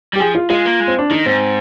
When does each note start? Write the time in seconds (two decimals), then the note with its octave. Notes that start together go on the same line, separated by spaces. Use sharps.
0.13 G3 G4
0.20 F3 G#4
0.35 F4
0.50 G#3 F4
0.65 A#3
0.80 G#3
0.87 C4
0.98 D4
1.10 D#3 D#4
1.26 G#2 C4